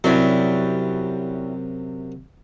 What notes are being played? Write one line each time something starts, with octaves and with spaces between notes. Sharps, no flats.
F#2 C3 F#3 G3 E4